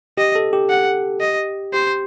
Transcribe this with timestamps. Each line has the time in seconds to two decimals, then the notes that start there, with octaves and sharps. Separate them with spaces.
0.18 G4 D#5
0.35 A4
0.53 G4
0.70 F#5
1.21 D#5
1.73 G4 C5